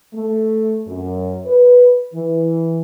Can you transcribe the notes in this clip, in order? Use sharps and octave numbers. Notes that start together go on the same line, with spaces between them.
A3
F#2
B4
E3